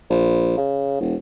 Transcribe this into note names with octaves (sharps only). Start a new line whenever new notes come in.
A#1
C#3
E1